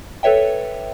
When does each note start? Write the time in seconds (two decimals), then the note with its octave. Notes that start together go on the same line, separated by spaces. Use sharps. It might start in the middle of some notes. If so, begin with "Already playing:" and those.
0.23 A4 B4 C#5 E5 G5